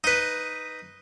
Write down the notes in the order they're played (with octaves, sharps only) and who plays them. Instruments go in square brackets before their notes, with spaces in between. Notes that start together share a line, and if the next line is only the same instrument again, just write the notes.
[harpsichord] D#4 B4